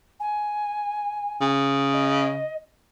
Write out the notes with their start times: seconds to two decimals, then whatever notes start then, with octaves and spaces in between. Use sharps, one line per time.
0.19 G#5
1.41 C#3
1.93 D#5